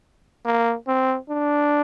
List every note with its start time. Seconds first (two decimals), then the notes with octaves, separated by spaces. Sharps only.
0.45 A#3
0.87 C4
1.29 D4